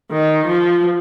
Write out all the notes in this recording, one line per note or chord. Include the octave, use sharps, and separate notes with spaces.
D#3
F3